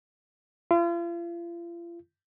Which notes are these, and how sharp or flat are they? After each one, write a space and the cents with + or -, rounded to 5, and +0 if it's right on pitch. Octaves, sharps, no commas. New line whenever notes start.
F4 -40